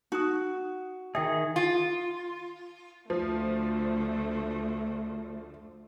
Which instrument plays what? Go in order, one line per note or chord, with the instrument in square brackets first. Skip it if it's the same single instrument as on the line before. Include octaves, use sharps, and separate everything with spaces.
[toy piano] D#4 D#6 [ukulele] F#4
[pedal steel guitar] D#3 G#4 [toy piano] E5 G5
[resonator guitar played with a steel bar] F4
[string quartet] D2 D3 A3 [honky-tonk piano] F3